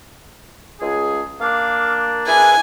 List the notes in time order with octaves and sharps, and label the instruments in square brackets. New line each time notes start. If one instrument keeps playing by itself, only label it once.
[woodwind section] C#2 C#3 G#4
[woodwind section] A#3 D4 [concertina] F5
[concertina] E4 G#4 B4 [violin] G#5